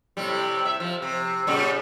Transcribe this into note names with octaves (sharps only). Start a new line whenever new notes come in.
A2 C3 G3
E5
F3
C3
A#2 C#3 G3